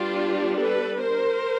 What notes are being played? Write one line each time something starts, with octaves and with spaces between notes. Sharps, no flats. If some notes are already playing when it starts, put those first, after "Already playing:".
Already playing: G3 B3 D4 F4 G4
A4 B4
A#4 C5